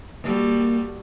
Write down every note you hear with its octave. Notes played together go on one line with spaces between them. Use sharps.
G3 A#3 F#4 A4